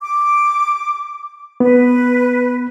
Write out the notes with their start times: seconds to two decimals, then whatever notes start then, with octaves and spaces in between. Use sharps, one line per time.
0.01 D6
1.60 B3 B4